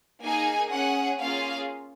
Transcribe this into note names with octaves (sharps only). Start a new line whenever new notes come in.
A#3 D#4 G#4 G#5
C#4 G#4 F#5
A#3 C#4 F4 G#4 F5